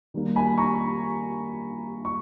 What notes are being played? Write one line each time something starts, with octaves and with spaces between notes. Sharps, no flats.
D#3 G3 A#3
G#5 B5
A#5 C#6
C#6